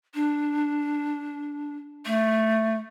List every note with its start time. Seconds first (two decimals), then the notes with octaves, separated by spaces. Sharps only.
0.14 D4
2.06 A3